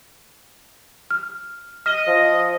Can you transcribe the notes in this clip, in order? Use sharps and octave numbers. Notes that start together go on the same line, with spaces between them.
F6
D#5 F6
F3